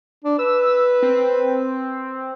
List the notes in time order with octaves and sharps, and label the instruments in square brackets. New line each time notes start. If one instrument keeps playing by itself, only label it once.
[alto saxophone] D4
[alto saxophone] B4 [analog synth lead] E6
[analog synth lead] C4